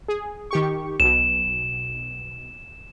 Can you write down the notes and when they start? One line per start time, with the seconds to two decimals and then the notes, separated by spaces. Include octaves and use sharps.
0.08 G#4
0.51 D#3 G4 C#6
1.00 B1 B2 E7